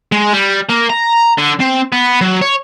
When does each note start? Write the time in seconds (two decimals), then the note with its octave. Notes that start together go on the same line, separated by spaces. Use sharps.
0.12 G#3
0.33 G3
0.69 A#3
0.90 A#5
1.38 D3
1.60 C4
1.92 B3
2.21 F#3
2.41 C#5